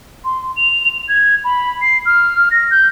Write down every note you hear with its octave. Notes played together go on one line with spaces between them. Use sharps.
C6
F7
G#6
B5
C7
F6
A#6
G6